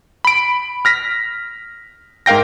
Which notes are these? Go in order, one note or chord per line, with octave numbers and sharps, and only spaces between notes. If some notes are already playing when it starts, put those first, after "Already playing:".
B5 D7
F6 A#6 B6
G#2 A#4 F5 G5 A#6